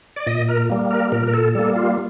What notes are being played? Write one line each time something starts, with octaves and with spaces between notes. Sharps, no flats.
D5
A#2 D#5
A#4
G3 A#3
A#4
A#2 A#4
A#4
A4
G3 A#3 A4
F4